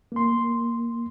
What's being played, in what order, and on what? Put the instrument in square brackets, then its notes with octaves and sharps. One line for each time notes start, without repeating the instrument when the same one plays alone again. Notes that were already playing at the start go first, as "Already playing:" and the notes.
[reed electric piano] A#3 C6